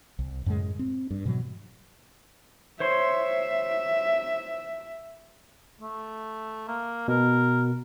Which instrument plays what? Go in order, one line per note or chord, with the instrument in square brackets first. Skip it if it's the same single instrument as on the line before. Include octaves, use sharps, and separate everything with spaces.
[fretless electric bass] C2
F#2 A2 C#3 G#3
C4
G2
G#2 B2 E3 F#3
[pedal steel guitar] C5 C#5 C6 [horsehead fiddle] E5
[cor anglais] A3
A#3
[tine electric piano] B2 [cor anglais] A#4